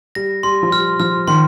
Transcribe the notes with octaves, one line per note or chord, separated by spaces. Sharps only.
G3 A#6
G3 C6
F3
G3 F6
F3 F6
D#3 C6